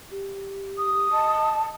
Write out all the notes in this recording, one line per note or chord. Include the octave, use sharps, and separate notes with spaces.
G4
D#6
D#5 A5